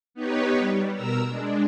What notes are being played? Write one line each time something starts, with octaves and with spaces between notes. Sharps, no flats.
B3 D#4 G4 B4 C#5
G3
B2 A#4 A#5 E6
G#3 D4